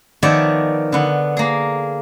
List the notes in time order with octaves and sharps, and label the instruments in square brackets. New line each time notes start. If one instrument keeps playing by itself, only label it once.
[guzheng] D#3 F3 B3 C#5 D5 E5
D3 B3
A#3 G#4